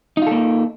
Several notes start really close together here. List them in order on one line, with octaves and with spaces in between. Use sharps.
D#4 F4 A4 A#3